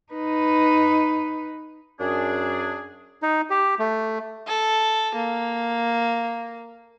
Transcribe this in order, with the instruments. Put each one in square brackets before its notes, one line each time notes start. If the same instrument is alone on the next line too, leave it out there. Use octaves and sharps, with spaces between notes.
[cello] D#4 B4
[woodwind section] F#2 D4 G#4
[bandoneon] D#4
G4
A3
[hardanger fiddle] A4
A#3